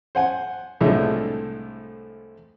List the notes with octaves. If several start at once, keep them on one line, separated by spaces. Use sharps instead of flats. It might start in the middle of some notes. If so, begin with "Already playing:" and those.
C5 F#5 G#5
C2 A2 D3 F3 G#3 A3